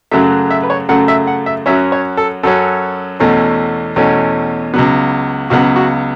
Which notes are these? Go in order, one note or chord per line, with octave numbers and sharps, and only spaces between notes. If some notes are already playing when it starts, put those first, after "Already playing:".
F#2 C#3 F#3 A3 E5
E5
B4
C#5
F#2 C#3 F#3 A3 F#5
E5
F#5
E5
F#2 F#3 C#4 E5
C#5
A4
F#2 F#3 C#4 A4
E2 B2 A3 C#4
E2 B2 A3 C#4
C#2 C#3 F#3 B3
C#2 C#3 F#3 B3 F#4
F#4